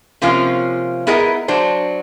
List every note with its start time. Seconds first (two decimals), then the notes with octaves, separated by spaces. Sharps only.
0.22 C3 F3 A#3 C#4 F4
1.07 B3 E4 G#4 A#4 D#5
1.48 F#3 D4 C5